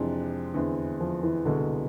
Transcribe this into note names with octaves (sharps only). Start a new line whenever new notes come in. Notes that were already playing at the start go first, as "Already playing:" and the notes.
Already playing: F2 C3 E3 G#3 D4
E2 D3 G#3 C4 E4
F3
E3
C2 B2 D3 G#3